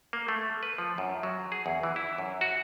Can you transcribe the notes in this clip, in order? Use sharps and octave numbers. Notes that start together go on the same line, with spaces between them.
A#3
A3
B4
F3
F#2
F#3
G#4
E2
E3
E4
F#2
F#4